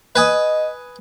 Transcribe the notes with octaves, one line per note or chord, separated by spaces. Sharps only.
B4 D#5 G#5 D#6